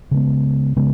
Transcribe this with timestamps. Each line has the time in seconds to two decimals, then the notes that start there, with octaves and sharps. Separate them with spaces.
0.11 C#3 G#3 B3
0.76 C#3 G#3 B3